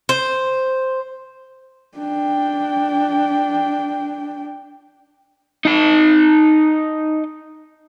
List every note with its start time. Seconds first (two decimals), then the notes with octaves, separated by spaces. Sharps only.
0.09 C5
1.97 D4 G5
5.65 D#4 A5